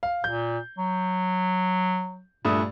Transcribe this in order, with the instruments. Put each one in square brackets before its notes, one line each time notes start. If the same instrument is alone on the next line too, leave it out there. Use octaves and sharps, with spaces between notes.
[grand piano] F5
[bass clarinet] A#2 [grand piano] G6
[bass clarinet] F#3
[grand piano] G2 A3 D#6 [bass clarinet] A#2